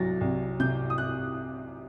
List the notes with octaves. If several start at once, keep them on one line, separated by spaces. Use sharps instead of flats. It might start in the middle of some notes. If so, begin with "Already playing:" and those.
Already playing: C2 C3 F#3 A6 A#6
C2
C3 G6
D#6
F#6